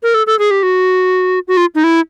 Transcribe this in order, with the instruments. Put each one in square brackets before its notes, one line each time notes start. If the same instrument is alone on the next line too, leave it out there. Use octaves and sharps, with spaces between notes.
[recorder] A#4
A4
A4
G#4
G4
F#4
F#4
F4
D#4
E4